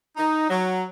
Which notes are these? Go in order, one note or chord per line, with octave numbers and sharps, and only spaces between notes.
D#4
F#3